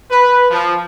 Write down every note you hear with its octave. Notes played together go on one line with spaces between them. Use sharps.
B4
F3